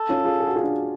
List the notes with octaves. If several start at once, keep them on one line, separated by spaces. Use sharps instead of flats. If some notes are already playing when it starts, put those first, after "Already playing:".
Already playing: A4
C#4 F4
F4 G#4
G#4
F#4
F4 G#4
D4 F#4